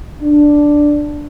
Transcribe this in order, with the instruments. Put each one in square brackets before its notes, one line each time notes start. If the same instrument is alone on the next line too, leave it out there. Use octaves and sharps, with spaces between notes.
[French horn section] D4